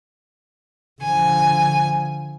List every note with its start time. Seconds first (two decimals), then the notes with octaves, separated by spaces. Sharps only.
1.02 D3 F3 G#5